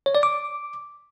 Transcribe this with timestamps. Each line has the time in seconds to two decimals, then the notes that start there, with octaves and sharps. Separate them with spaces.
0.06 C#5
0.15 D5
0.23 D6